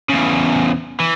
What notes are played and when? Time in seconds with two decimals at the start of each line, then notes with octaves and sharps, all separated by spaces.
0.09 E2 C#3
1.00 E3